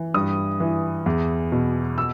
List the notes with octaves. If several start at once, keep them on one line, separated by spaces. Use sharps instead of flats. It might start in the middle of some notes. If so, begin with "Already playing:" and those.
Already playing: E3
G2 D#6
E3
E2
B2
E6